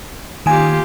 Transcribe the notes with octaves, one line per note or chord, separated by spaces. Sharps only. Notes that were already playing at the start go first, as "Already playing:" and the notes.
D#3 A#3 F4 G4 G#5